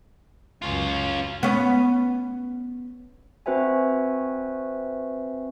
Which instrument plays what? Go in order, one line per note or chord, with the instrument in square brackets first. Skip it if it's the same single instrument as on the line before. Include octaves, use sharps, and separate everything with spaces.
[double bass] C#2 F#2 [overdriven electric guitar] C#4 F4
[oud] B3 C#4
[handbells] C4 F#4 B4 C5 E5 G#5